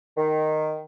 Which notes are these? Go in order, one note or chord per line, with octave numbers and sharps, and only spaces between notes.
D#3